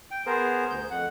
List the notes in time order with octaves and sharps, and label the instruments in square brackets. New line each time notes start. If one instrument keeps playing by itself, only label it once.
[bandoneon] G5
B3 G#4 A#4 C5
D2 G6
F2 F#5